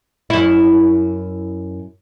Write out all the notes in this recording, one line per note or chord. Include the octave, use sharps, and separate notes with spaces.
F#2 E4